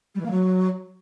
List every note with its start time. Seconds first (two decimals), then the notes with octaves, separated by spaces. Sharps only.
0.14 G3
0.20 E3
0.25 A#3
0.30 F#3